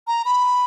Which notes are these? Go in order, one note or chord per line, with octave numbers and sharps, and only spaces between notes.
A#5
B5